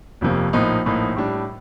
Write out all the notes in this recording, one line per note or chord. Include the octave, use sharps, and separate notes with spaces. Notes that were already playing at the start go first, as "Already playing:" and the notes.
F1 F2 C3 F3 A#3
A#1 A2 F3 A#3 D#4
A#1 A2 F3 A#3 D#4
A2 G3 D4